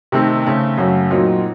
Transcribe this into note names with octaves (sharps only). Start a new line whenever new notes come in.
C3 D#3 A3 C4
C#3 A3 C4
F#2 C#3 A3 C#4 F#4
A#2 F#3 C4 D#4 F#4